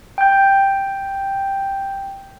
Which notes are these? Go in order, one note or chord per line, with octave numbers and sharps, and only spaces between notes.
G5 G6